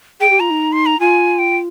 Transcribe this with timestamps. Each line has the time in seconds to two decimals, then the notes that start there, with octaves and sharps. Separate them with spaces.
0.20 G#4 G5
0.30 G4
0.40 F4 A#5
0.50 D#4
0.72 C6
0.86 A#5
0.99 F4 G#5
1.39 G5